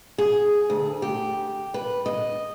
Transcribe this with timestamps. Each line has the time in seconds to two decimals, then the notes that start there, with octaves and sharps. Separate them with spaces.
0.18 G#4
0.70 D2
1.02 G4
1.74 B4
2.06 D#5